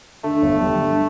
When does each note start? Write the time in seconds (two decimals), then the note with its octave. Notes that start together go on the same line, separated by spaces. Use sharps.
0.24 D3 A3
0.42 G1
0.62 G3
0.82 G2